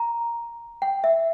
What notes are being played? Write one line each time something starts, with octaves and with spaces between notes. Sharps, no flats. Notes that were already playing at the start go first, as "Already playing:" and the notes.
Already playing: A#5
G5
E5